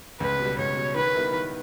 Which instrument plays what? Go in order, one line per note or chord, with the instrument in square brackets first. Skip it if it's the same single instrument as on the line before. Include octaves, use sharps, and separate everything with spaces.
[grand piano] C#2 [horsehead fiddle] B4
[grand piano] B2 G3
[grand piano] C#2 [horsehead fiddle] C#5
[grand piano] B2 G3
[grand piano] D#3 [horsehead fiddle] B4
[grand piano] G3 B3 E4 A#4
D#3